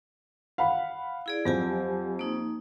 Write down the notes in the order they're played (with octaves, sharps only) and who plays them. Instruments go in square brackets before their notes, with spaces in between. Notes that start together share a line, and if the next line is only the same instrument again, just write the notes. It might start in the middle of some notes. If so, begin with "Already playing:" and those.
[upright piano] F5 F#5 B5
[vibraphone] E4 G#4 D5
[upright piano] F2 [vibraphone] F#3 G4 G#5
[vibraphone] A#3 D#4